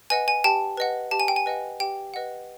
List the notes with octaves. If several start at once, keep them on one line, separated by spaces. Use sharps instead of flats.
B4 D#5 F#5 G#5
G#5
G4 G5 A5
B4 D#5 F#5
G4 A5
G#5
G5
G#5
B4 D#5 F#5
G4 G5
B4 D#5 F#5